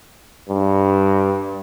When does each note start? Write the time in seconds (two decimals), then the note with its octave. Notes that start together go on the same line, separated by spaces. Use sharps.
0.49 G2